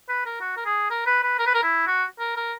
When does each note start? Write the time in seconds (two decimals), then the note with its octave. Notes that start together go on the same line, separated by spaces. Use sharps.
0.09 B4
0.26 A#4
0.41 F#4
0.57 A#4
0.66 G#4
0.90 A#4
1.06 B4
1.23 B4
1.39 A#4
1.47 B4
1.54 A#4
1.63 E4
1.87 F#4
2.19 A#4
2.36 A#4